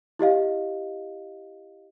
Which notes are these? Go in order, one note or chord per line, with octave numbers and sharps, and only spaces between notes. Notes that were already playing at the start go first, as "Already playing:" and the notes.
E4 G4 D#5 F5